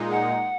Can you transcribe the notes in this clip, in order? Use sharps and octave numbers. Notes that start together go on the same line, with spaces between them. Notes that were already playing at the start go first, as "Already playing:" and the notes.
Already playing: A#2 G#3 D#4
F#5